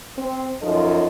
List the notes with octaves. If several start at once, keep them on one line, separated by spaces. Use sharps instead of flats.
C4
F#2 F3 D#4 F4 A4 D#5